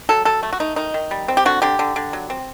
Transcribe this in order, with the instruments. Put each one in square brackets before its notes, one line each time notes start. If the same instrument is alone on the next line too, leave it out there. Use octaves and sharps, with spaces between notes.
[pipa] F#3 A4
F#3 A4
A3
F#4
A3 D#4
D#3 D#4
D#3
G3
C4
G4
D3 F#4
D3 G4
D3
D3
F#3
C4